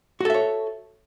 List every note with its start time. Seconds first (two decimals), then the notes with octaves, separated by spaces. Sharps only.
0.20 F#4
0.25 A4
0.30 E5
0.34 C#5